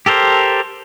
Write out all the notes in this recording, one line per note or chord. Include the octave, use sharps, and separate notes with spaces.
G4 A4 A#4 C5